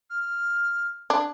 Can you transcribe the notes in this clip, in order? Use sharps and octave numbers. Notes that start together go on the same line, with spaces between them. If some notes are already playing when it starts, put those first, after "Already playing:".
F6
D4